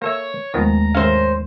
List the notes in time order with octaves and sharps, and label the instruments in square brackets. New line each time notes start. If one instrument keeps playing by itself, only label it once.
[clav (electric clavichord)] A#3 A4 E5 [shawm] C#5
[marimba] D#2 G#3 A3 [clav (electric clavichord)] D#3 F3 B3 [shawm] A#5
[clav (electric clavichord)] G#1 E5 F5 [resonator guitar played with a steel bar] C#4 C5